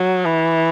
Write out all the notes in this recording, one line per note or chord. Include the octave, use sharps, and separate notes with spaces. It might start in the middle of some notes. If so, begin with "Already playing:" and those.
Already playing: F#3
E3